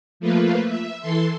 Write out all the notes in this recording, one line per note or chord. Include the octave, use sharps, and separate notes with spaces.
F3 A3 A#3 F4 B4
E5
E3 A4 C6